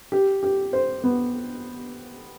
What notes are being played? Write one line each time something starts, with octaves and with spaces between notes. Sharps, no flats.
G4
G4
C5
B3